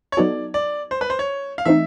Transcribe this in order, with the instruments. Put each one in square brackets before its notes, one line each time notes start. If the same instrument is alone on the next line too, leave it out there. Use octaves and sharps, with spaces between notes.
[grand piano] C#5
[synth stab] F#3 B3 D#4 F#4 A4 [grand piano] D5
[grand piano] D5
C5
B4
C5
C#5
F5
[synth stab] E3 A3 C4 D#4 [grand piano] E5